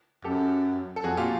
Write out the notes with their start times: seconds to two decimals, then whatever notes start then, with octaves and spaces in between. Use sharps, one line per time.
0.24 F#2 G4 A4
0.96 A4
1.04 F2 F#4 G#4
1.17 A#2 F4 G4